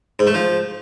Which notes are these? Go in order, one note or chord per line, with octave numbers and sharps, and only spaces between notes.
G#2
A3
F3